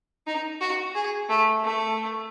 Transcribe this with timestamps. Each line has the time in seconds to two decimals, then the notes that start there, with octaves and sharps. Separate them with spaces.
0.27 D#4
0.61 F#4
0.95 G#4
1.29 A3
1.64 A3